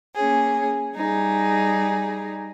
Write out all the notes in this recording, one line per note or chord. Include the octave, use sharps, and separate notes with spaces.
A#3 C#4 G#4
G3 D#4 G#4